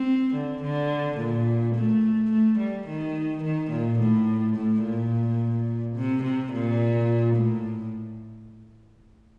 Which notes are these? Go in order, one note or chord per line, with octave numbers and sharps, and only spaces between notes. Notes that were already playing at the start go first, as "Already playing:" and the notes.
Already playing: C4
D3
D3
A#2
A3
A3
G3
D#3
D#3
A#2
A2
A2
A#2
C3
C3
A#2
A2